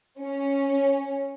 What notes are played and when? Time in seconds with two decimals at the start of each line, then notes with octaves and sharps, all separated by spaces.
0.19 C#4